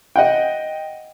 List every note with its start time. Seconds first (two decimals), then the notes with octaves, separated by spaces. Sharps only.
0.16 D#5 F#5 G5